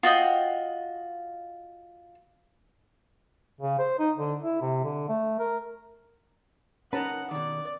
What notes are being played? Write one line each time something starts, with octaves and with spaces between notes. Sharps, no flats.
F4 F#4 D#5 G5
C#3
C5
D#4
D3
E4
C3
D3
A3
A#4
C#4 D#4 A#4 B4 F#5 A5 A#5
B2 D#3 D5